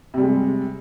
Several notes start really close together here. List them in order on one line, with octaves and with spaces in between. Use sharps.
C3 G3 G#3